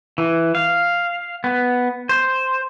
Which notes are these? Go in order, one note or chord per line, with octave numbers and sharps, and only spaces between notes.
E3
F5
B3
C5